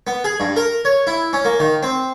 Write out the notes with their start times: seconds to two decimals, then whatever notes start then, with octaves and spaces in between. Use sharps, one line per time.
0.07 B3
0.24 G#4
0.40 G2
0.56 A#4
0.85 C#5
1.07 E4
1.33 C#4
1.45 A#3
1.60 D#3
1.83 C4